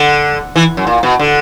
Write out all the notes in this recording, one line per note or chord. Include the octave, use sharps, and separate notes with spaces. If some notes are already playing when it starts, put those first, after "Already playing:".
Already playing: D3
E3
F#2
A#2
B2
D3